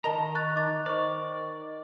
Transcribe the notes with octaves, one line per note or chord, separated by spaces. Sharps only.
D#3 A#4 D#5 A5 A#5
C#6 F#6 A6
D#4 D6 A6
D#3 C5 D5 C#6